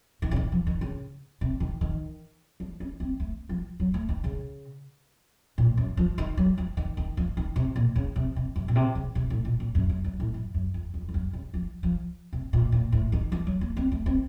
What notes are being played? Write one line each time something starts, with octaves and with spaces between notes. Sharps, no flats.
D#3
C#3
D#3
F3
D#3
C#3
C3
D#3
D#3
F3
C#4
C4
A3
F3
F#3
A3
D#3
C#3
A#2
F#2
F3
D#3
F#3
F3
D#3
D#3
F3
D#3
C3
A#2
C#3
C3
C3
F#2
A#2
C3
C#3
C3
A2
A#2
A#2
F#2
F#2
F#2
A2
F#2
F#2
F2
F2
F2
F#2
C#3
F3
F3
C3
A#2
A#2
A2
D#3
F3
F#3
A#3
C4
A3
C4